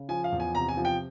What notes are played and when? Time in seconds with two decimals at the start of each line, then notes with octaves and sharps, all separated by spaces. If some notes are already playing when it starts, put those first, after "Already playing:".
Already playing: C#3
0.09 F3 G#5
0.24 F5
0.32 E2
0.40 G#5
0.55 C3 A#5
0.69 G#5
0.77 F3
0.85 G5